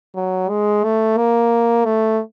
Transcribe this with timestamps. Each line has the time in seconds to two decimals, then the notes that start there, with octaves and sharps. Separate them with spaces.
0.16 F#3
0.49 G#3
0.84 A3
1.18 A#3
1.85 A3